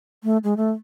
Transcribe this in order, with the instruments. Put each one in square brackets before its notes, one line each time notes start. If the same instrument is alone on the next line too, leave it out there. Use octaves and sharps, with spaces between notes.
[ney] A3
G#3
A3